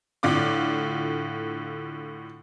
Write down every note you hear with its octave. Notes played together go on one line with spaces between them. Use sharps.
A2 D3 F4 D6